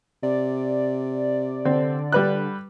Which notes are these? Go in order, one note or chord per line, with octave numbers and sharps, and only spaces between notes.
C3 D5
D3 C4
G3 B4 F#6